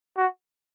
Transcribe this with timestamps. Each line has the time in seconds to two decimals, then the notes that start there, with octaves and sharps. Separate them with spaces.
0.18 F#4